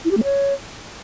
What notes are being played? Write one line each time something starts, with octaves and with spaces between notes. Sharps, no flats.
E4
G4
A3
C#5